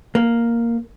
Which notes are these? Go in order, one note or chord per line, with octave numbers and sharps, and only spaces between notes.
A#3